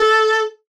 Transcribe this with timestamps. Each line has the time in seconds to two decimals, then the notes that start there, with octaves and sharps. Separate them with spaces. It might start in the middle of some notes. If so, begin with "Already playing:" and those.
Already playing: A4